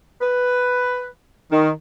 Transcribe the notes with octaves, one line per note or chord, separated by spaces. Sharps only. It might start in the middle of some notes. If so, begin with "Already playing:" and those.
B4
D#3